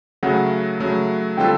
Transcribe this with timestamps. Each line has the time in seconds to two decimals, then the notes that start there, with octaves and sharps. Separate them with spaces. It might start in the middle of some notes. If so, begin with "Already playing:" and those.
0.23 C#3 F#3 A3 F#5
0.80 C#3 F#3 A3
1.37 D3 G3 C4 F4 A4 G5